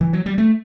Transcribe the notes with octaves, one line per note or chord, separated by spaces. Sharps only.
E3
F#3
G3
A3